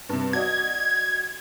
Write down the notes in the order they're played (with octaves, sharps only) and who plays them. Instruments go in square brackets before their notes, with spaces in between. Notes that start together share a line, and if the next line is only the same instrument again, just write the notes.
[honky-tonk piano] G2 C3
[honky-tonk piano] F#4 D5 D#5 [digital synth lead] G#6